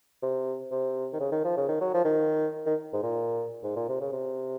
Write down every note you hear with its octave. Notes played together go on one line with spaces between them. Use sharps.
C3
C3
D#3
C#3
D#3
F3
C#3
D#3
F#3
F3
D#3
D#3
G#2
A#2
G#2
A#2
C3
C#3
C3